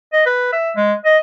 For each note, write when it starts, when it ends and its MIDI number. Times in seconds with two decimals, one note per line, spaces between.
0.13 0.21 75
0.26 0.50 71
0.53 0.71 76
0.76 0.94 56
1.05 1.18 75